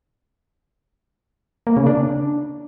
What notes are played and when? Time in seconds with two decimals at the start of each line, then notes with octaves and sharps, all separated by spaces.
1.67 A#3
1.77 C#3
1.87 D4